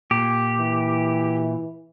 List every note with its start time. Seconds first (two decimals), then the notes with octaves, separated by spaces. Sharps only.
0.11 A#2 G4
0.59 E3